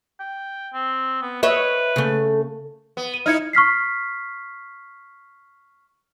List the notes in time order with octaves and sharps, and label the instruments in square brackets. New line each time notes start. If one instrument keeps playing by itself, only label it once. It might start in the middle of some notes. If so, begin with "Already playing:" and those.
[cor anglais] G5
C4
B3
[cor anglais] B4 [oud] C#5 D#5 E5
[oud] C#3 A3
[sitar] B3
[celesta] D#7
[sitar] D#4 E4 [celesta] F6 G#6 C#7
[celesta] C#6 F6 B6 C7